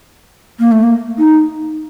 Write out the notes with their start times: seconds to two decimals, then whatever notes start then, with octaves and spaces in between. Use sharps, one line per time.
0.60 A#3
0.72 A3
0.83 A#3
1.18 D#4